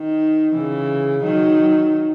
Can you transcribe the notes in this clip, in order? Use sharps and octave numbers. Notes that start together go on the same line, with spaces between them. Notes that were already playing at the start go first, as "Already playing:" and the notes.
Already playing: D#3
C#3 E3
D#3 F#3